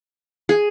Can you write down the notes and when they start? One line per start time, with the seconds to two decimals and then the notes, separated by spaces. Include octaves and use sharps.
0.49 G#4